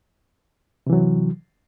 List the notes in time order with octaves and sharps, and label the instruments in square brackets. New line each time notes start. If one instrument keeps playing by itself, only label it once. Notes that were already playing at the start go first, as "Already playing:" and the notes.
[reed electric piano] C3
E3
F#3